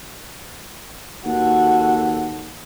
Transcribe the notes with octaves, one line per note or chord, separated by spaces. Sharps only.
D#2 F#4 A4